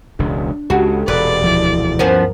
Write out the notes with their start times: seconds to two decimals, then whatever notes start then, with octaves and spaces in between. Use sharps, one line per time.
0.19 E1 C#2 D4
0.70 C#2 C#3 F#4 G4 A4
1.08 E1 A#2 B4 D5
1.42 D2 F3 E4
1.99 G2 F3 B3 C#4 A#4